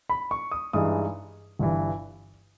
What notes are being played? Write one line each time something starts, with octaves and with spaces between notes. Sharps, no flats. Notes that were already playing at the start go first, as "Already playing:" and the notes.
B5
C#6
D#6
G2 E3 G#3 D#4 D#6
G1 G2 E3